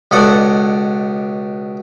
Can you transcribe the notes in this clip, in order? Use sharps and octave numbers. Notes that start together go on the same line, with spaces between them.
C#2 B2 A4 D5 F#5